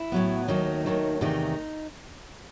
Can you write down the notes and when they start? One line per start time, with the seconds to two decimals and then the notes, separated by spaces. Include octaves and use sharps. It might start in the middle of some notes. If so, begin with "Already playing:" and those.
Already playing: E4
0.12 A2 F#3 B3
0.48 D#2 D#3 F#3 A3 D#4
0.85 D#2 D#3 F#3 A3
1.21 E2 C3 D#3 A3 D#4